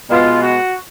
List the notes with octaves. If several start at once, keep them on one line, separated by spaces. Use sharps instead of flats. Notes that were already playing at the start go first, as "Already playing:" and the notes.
B2 G#3 B3 F4
F#4